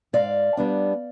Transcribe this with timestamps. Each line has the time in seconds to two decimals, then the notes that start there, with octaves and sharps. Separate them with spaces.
0.13 G#2 D5 F5
0.57 G3 B3 D4